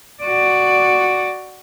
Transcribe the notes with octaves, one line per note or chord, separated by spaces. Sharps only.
F#4 D5